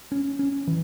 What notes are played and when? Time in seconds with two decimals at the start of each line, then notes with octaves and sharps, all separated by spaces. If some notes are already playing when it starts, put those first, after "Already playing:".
0.12 C#4
0.39 C#4
0.67 E3